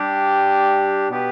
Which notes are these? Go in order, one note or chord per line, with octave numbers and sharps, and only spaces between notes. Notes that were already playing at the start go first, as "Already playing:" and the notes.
Already playing: G3 D4 G4
B2 B3 G4 B4